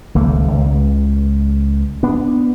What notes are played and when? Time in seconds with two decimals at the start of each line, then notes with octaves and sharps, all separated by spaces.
0.15 D#1 C#2 A3 A#3
0.53 C#2
2.03 B3 D4